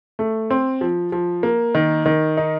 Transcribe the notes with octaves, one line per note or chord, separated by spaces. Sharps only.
A3
C4
F3
F3
A#3
D#3
D#3
D#4